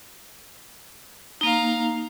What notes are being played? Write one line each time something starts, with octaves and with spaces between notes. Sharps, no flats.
A#3 D#4 F5 A#5